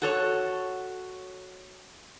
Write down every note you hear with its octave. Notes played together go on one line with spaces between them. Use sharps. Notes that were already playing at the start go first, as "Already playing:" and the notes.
F#4 A4 C#5